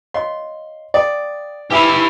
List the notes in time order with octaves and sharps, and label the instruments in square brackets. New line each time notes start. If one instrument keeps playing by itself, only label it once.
[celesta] C#5 D#5 F5 [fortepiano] C6
[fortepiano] D5 [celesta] F5 G5 D#6
[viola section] E4 [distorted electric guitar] G4 F5 [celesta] B4 G#5